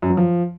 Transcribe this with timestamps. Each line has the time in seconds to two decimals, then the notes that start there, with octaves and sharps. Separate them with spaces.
0.02 F#2
0.10 F#3
0.17 F3